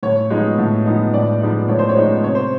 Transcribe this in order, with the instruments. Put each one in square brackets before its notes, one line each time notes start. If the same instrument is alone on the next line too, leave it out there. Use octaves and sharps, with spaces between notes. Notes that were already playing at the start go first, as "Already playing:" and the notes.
[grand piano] A2 [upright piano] C#5
[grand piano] F3 G#3 B3 D#4
A2
F3 G#3 B3 D#4
[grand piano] A2 [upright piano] D5
[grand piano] F3 G#3 B3 D#4
[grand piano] A2 [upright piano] C#5
[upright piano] C5
C#5
[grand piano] F3 G#3 B3 D#4
[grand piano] C3 [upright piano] C#5
[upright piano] C5